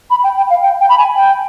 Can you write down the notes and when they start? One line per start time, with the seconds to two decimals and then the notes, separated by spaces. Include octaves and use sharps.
0.10 B5
0.24 G5
0.37 G5
0.50 F5
0.63 G5
0.81 G5
0.89 B5
0.98 G#5
1.16 G5